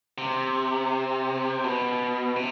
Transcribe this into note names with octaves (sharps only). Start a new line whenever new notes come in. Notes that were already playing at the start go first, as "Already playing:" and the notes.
C3
B2
C3